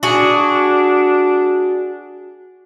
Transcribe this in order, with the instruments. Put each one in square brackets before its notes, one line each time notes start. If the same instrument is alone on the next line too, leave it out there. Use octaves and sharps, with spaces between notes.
[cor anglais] D4 [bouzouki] F#4 G#4